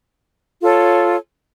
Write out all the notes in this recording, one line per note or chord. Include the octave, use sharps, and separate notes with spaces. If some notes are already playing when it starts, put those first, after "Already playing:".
F4 A4 C#5